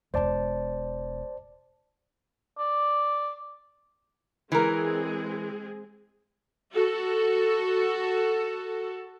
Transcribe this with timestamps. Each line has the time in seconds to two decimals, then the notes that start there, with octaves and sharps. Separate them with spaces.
0.14 E1 D#4 C5 D5 A5
2.59 D5
4.52 E3 G#3 C4 G#4 A#4
6.74 F#4 A4